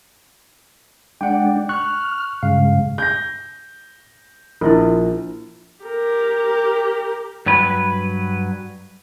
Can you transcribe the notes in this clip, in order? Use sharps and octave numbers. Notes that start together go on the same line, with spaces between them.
G#3 D4 D5 F#5 G5
C#6 F6 F#6
G2 C#3 G#3 F5
G6 A#6
A#1 E4 F4 A#4
G4 A#4
G2 F#3 B4